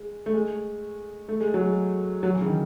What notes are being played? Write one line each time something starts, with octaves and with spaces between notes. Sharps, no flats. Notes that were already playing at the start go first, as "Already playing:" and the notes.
Already playing: G#3
A3
G#3
A3
G#3
F#3
G#3
F#3
E3
C#3
D#3